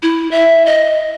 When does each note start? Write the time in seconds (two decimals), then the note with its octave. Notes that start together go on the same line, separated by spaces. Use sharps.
0.03 E4
0.31 E5
0.66 D#5